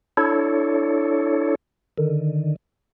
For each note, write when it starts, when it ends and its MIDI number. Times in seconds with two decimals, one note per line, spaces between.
0.17 1.55 62
0.17 1.55 64
0.17 1.55 69
0.17 1.55 73
1.98 2.56 50
1.98 2.56 51